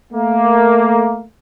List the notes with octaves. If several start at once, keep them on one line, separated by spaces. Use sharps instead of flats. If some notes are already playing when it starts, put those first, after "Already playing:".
A3 A#3